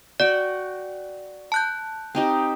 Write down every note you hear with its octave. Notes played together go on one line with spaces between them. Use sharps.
F#4 D5 F#5 G5
A5 F#6 G6
C4 D#4 G4